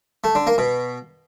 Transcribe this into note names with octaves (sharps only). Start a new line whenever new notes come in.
A3
D3
A#3
B2